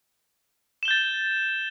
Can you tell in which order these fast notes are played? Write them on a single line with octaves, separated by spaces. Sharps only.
E7 G7 G6 A6